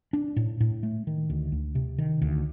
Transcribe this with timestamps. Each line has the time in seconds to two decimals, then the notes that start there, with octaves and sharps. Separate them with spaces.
0.13 D4
0.36 A2
0.60 A2
0.83 A3
1.07 D#3
1.30 D2
1.52 D2
1.75 C3
1.98 D#3
2.22 D2